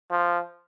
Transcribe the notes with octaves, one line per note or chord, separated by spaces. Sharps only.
F3